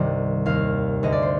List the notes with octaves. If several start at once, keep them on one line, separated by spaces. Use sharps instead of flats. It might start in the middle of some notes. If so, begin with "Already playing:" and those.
Already playing: C2 G2 C3 D#3 D5
D#2 D#3 F5
D2 D3 D#5
D5
C5